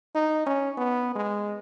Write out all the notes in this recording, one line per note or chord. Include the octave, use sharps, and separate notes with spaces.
D#4
C#4
B3
G#3